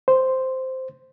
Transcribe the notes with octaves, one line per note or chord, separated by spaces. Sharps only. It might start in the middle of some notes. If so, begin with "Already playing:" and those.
C5